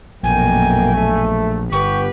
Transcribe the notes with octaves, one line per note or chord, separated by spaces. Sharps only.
A#1 F#2 B2 A3 A#3 G5 G#5
A3
G1 B3 G4 B4 C#6